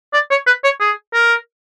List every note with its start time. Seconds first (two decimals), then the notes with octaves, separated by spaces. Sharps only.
0.13 D5
0.31 C#5
0.47 B4
0.64 C#5
0.80 G#4
1.14 A#4